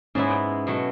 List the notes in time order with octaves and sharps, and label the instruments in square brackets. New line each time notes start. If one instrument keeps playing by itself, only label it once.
[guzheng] G#2 G#3 B3 E4 [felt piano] C#4
[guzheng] B2 F#3 A3